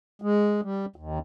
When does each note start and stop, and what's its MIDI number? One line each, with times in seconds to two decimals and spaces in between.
0.22 0.61 56
0.62 0.85 55
0.96 1.19 39